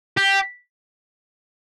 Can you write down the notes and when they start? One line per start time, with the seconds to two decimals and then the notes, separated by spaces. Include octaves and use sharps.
0.17 G4